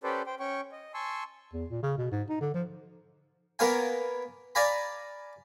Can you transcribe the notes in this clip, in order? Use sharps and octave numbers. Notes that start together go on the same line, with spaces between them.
C#4 G4 A4 B4 C5 D5
C5 G5
C#4 C#5 G5 C#6
D#5
G#5 A5 C6 C#6 E6
E2
A#2
C#3
B2
G#2
D#4
D3
F3
A#3 B3 A#4 C#5 F5 G#5
D5 F5 G#5 A#5 B5